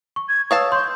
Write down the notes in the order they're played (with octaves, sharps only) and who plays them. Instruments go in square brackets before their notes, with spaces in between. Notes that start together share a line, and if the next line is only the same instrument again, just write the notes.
[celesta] C#6
[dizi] G#6
[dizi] B4 [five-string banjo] C#5 F5 A5 [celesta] D#6 E6
[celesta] C6 C#6 [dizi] G6